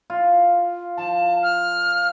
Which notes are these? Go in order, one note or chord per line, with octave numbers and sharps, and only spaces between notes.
F4
F3 A5
F6